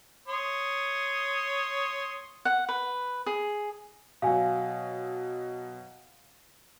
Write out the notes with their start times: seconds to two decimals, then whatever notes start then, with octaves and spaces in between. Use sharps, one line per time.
0.28 C#5 C6 D#6
2.45 F#5
2.69 B4
3.26 G#4
4.22 B2 F#3 F5 G#5